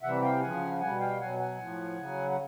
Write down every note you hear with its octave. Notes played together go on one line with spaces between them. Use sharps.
C3 E3 G3 E5 F#5
F5 G5
C#3 F3 F#5 G#5
B2 G3 F#5 G#5
F5 G5
B2 F#3 F#5 G#5
F#5 G#5
A2 F3
C#3 F#3
F#5